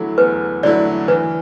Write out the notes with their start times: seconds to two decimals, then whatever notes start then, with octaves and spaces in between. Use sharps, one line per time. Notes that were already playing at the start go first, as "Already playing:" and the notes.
Already playing: E2 D3 F#3 A3 E4
0.18 E2 B4
0.63 D3 F#3 A3 E4 D5
1.08 E3 B4